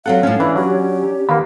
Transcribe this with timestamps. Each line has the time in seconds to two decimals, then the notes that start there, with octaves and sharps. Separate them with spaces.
0.06 F#3 C4 A4 F5 F#5
0.23 A2 F3 C#4
0.40 E3 D4
0.56 F#3 G4
1.29 D#2 A#3 B3 F5 B5